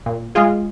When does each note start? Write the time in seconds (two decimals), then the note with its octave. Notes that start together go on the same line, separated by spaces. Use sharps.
0.06 A#2
0.35 G#3 F4 G#4